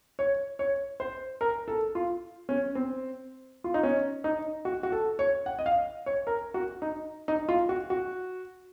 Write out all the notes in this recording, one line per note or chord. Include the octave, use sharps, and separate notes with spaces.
C#5
C#5
C5
A#4
A4
F4
C#4
C4
F4
D#4
C#4
D#4
F#4
F#4
A4
C#5
F#5
D#5
F5
C#5
A#4
F#4
D#4
D#4
F4
F#4
F#4